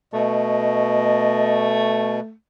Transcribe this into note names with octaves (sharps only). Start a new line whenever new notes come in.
B2 A3 D#5